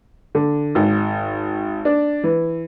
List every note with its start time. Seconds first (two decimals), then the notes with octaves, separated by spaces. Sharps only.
0.35 D3
0.75 G#1
1.85 D4
2.24 E3